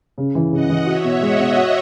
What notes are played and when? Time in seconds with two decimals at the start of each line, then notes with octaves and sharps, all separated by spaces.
0.18 C#3
0.35 E3
0.53 C#3 D#5 F#5
0.69 E3
0.86 F#4 C#5 E5
1.04 B2
1.21 G#3 D#5 F#5
1.39 B2
1.56 F#4